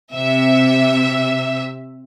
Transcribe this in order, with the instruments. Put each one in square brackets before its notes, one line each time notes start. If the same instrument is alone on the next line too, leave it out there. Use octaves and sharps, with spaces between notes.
[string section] C3 E5